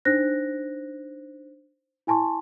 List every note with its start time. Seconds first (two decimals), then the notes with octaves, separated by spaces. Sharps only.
0.05 D4 D#4 C5 F#6 A#6
2.07 E4 G#5 A5 C6 C#6